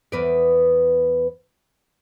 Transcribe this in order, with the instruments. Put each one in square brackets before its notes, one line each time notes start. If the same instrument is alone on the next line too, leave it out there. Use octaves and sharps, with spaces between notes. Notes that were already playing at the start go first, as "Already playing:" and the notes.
[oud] E2 B3 D5